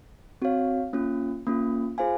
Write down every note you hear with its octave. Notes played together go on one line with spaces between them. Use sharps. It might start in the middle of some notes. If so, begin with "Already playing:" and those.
C4 F#4 C#5 F5
A#3 C#4 F4
A#3 C#4 F4
F4 G#4 C5 F5 G#5